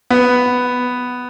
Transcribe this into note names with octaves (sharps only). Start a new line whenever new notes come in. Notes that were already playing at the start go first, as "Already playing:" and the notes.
B3